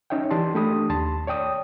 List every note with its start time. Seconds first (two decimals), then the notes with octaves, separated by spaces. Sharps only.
0.10 C#4 D#4 C#5 E5 G5
0.31 E3 G4 D5 A5 C6
0.55 A3 D4 G4 B5 D#6
0.89 D#2 A5 C6
1.27 C#5 D5 G5 D#6